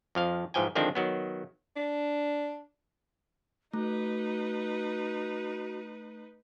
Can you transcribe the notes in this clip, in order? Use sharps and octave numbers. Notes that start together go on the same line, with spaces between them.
F2 F3 F5
G#2 E3 F3 G5 G#5
D3 D#3 F3 G#3 C4 D4
D#3 F#3 B3
D4
A3 D#4 F#4 B4